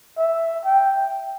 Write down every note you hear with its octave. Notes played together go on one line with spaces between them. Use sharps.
E5
G5